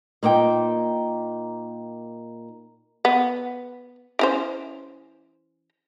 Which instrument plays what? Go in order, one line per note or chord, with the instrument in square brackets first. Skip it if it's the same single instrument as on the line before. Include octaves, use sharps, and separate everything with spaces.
[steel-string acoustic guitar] A#2 A#3 D#4 G5
[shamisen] B3
E3 C#4 C5